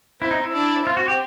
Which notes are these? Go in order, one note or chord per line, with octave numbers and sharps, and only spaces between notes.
C4 E4
D#4
E4
D4
C4 F4
F#4
G4